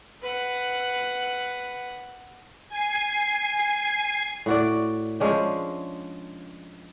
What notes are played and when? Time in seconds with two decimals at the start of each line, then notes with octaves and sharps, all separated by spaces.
0.22 B4 F#5
2.69 G#5 C7
4.46 A2 F#4 D5
5.20 F3 G#3 C#4 D4